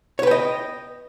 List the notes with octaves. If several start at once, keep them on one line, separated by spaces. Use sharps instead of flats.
B4 C#5 D#5 G5